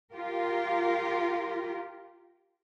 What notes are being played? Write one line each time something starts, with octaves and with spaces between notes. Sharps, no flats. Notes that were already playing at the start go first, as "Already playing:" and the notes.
F4 G4 A#4